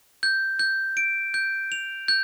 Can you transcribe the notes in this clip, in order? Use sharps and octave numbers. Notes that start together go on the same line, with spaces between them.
G6
G6
D7
G6
F7
G6